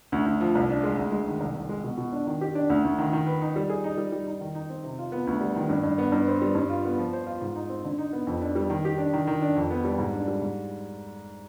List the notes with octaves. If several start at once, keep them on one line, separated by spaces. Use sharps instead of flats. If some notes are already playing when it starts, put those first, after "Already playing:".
D2
D2
F3
C2
D4
G#3
D2
G#3
D#3
C2
C2
G#3
B2
B2
D4
D#3
G4
D4
D2
D2
D#3
D#3
B4
D#4
G3
G#4
D#4
G3
G3
D#4
D#3
D#4
C4
C3
F4
B3
D2
G3
D#3
G2
G2
B3
G2
C4
G3
G2
F4
B3
F3
C5
F4
G#2
D#4
C4
D3
D#4
B3
F2
D4
G3
D#3
G4
D4
D#3
D#3
D4
F2
B3
G3
G#2
D4
G3
G#2